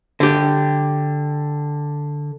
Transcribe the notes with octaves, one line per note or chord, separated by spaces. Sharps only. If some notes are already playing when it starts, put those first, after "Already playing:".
D3 G4